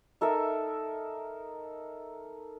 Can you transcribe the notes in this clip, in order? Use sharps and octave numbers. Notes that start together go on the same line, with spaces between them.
D#4 A4 A#4 E5